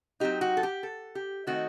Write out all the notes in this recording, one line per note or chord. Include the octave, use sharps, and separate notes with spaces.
F#3 C4 D#4 G4
F#4
A4
G4
A4
G4
D#3 A3 C4 D#4 F#4